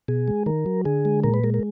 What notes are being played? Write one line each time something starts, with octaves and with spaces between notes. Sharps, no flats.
B2 G#4
G#3
D#3 A#4
F#3
D3 G#4
G#3
A#2 A#4
B4
G#3 A#4
A#4